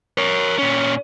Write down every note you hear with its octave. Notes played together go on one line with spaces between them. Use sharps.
A#4 C#5
A#2 C#4